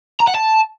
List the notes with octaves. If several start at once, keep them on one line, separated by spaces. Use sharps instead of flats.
A#5
F#5
A5